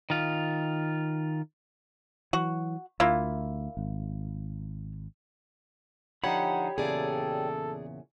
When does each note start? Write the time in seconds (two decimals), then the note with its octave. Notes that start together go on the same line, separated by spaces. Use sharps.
0.10 D#3 F4
2.33 E3 F#3 F#4
3.00 D2 A#3 E4 F4
3.77 G#1
6.24 D3 F3 D#4 G4 C#5 F#5 B5
6.78 E2 A#2 C#3 G#4 A4 D5